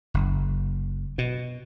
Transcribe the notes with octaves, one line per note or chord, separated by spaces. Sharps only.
F#1
B2